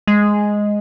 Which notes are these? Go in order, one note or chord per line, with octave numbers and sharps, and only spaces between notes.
G#3